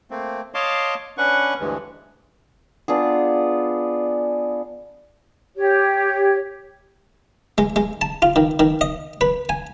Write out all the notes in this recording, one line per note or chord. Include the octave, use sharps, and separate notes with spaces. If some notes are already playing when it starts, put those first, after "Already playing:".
A3 A#3 C4
C#5 D#5 F5 A5 C6 D6
C#4 D4 B4 F#5 C#6
D2 G2 E3 G#3
B3 D4 F4 G#4
G4 C#5
G#3
G#3
A5
F4
D#3
D#3
D#5
B4
G#5